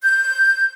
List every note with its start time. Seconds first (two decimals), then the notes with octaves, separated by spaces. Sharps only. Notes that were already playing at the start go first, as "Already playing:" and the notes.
0.03 G6